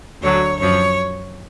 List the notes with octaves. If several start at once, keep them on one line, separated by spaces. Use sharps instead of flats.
D2 D3 F#3 C#5
F#2 F3 C#5